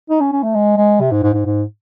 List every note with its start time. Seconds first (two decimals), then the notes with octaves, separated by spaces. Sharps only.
0.10 D#4
0.21 C#4
0.33 C#4
0.43 A3
0.54 G#3
0.77 G#3
1.00 C3
1.11 G#2
1.23 G#2
1.34 G#2
1.46 G#2